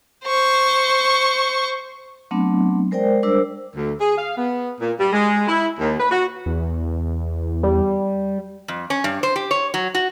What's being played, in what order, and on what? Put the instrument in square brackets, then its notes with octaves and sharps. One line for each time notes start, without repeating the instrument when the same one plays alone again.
[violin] C5 C#6
[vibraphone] F#3 A3 B3 C4 D4
G#3 A#4 C5 D5 G5
G3 D4 A#4 C5 E6
[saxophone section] D2
G#4
F5
B3
A#2
G3
G#3
E4
D#2
B4
F#4
[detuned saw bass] E2
[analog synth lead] G3
[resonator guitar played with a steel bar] F2
C#4
G2
C5
G4
C#5
F#3
F#4